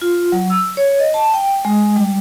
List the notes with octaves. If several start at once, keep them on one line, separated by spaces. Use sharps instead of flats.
F4
F#3
E6
C#5
D#5
A5
G5
G#3
G3